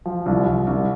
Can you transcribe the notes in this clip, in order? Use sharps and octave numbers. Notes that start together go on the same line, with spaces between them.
F3
C2
C2
C2